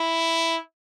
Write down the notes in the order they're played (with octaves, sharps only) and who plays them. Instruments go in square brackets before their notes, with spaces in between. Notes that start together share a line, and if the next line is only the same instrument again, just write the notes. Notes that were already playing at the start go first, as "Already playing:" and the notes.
Already playing: [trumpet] E4